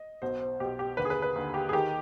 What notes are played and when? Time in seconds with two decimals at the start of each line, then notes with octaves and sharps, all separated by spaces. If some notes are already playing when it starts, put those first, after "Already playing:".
Already playing: D#5
0.22 B1 B2 C5
0.40 C5
0.60 B1 B2 G4
0.79 G4
0.97 D#2 D3 B4
1.05 G#4
1.10 B4
1.22 B4
1.36 D#2 D3
1.54 G4
1.69 G#4
1.73 D#3 G4